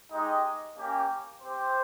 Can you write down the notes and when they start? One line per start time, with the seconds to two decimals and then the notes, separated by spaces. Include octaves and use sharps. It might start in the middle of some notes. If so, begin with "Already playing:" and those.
0.11 G#3 D#4 G4 D#5
0.77 A#3 C#4 G4
1.42 C4 G4 C5